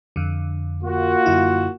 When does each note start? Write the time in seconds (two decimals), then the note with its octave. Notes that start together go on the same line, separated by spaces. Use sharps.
0.16 F2 D3
0.84 A#3 F4 F#4
1.26 F#2 D3 E4